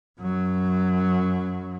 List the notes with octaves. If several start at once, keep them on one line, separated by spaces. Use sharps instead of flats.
F#2 F#3